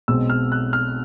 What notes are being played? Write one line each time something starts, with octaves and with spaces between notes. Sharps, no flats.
B1 B2 G#3 C4 E6
F6
F#6
F6